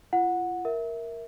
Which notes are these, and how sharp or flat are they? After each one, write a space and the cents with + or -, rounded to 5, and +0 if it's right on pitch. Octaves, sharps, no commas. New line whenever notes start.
F4 -40 F#5 -15
A#4 +0 E5 -10